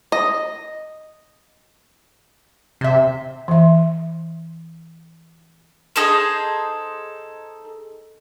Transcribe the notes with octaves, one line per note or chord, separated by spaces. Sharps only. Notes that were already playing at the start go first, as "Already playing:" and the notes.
D#5
C3 C5 E5
E3 E5
D#4 G#4 A4 C5